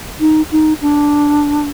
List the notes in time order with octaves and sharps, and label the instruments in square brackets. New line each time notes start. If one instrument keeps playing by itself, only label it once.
[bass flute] D#4
D#4
D4